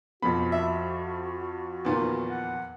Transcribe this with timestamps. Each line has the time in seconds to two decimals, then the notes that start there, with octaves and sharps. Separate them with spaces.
0.22 F2 B2 F3 F#4 B5
0.52 E5
1.85 E2 A#2 D#3
2.30 F#5